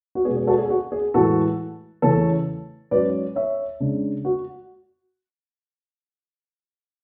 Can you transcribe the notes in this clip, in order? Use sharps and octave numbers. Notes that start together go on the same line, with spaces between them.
F#4
B2 G#3 B3 G#4
G#4
F#4 A4
G#4
F#4
G#4
A2 E3 G#3 F#4 A4
E2 C#3 E3 A3 C#4 A4 C#5
G#2 F#3 C#4 B4 D5
C#5 E5
C#3 G#3 D4
F#4